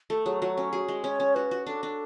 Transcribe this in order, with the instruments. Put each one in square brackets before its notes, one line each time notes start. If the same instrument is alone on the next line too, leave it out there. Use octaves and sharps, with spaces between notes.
[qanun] A3 [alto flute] A4
[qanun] F#3 [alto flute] G#4
[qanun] F#3 [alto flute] F#4
[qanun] C#4 [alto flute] F#4
[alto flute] F#4 [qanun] G#4
[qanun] G#3
[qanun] C#4 [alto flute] C#5
[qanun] C#4
[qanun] F#4 [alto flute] B4
[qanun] F#4
[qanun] D4 [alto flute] A4
[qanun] D4